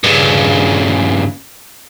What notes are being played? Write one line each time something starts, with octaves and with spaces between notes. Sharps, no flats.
G2 C#3